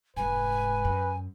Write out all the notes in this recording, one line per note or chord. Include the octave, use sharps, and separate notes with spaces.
F1 G#2 B4 G#5
F#2